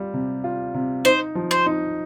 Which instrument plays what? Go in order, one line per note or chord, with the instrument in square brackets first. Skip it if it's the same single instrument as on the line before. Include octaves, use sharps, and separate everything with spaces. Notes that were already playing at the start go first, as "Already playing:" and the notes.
Already playing: [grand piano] G3 F4
C3
F4
C3
[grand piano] D#4 [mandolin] C5
[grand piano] F3
[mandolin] C5
[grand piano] D#4